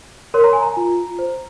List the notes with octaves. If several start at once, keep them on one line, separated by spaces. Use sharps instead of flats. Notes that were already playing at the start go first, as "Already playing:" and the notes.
A#4 C#5 C6
A#5
G#5
A#5
F4
C5